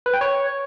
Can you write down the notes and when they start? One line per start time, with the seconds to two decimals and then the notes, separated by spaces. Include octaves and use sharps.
0.06 B4
0.14 G5
0.21 C#5